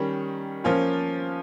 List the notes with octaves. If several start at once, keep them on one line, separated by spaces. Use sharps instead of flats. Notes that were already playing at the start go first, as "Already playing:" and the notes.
Already playing: D#3 G3 C#4
F3 A#3 C#4 F4